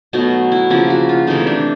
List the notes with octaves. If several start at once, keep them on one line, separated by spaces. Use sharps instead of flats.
B2 F#3 A3 D#4
E4
C#3 F3 A#3 E4
F#4
F4
C3 E3 A3 D#4
D4